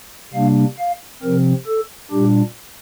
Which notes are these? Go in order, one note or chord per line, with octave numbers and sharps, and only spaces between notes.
C3 G3 A#3 D4 F5
F5
C3 F3 C4 A#4
A4
A#2 G3 D4 G4